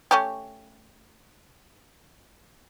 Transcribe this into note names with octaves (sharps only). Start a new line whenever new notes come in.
A3 C#4 G4